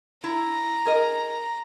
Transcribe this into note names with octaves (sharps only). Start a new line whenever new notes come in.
E4 A#5
G#4 A#4 D#5